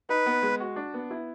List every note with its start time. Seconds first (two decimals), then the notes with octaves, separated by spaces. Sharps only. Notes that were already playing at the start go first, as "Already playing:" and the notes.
0.09 D#4 B4
0.26 B3
0.43 G#3
0.60 F#4
0.76 D4
0.94 B3
1.11 E4